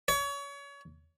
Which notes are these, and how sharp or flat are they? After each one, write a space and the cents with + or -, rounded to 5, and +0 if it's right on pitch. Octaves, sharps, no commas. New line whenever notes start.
C#5 +30